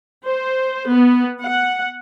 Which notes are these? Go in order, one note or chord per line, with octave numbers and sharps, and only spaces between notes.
C5
B3
F#5